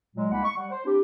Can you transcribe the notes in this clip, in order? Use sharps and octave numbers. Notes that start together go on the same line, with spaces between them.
A#2 F#3 G#3
C2 G#3 A#3 D#4 F#5 B5
C#6
G3 F#5
C5
C4 D4 E4 G4